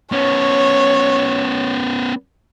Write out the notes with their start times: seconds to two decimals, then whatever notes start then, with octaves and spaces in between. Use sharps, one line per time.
0.12 B3 C#4 C#5